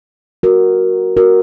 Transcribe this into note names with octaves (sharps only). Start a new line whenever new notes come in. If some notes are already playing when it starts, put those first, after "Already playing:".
F#4 A#4
F#4 A#4